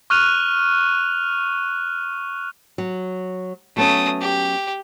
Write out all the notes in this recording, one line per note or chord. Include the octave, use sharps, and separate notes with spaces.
C#6 F6 F#6 D#7 F7
F#3
F#3 A3 B3 C#4 D#6
G4